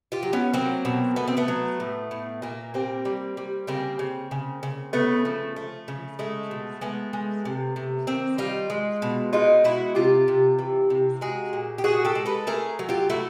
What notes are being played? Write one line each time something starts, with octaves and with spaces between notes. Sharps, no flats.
F4 G4
F#3
B3 C#4
F#3 A#3 C4
B2
A3 B3
C4
A3 B3
F#3
A2
A2
A#2 A#3
G3 A#3 C4
G3
G3
C#3 A#3 C4
C#3
C#3
C#3
C#3 A3 B3
F3
A3
C#3
G#3 A3
B2
G#3 A3 B3
G#3
C3
C3
D#3 A#3 C4
G3 D#4 F4
G#3
B2
G#3 D#4 F4
B2 E4 F#4
C3 F4 G4
C3
E3
C3
G#3 F#4 G#4
A#2
G4
A#2 F#4 G#4
G4 A4
G#3
A4 B4
A3 G#4 A#4
F#3
F4 G4
A3 E4 F#4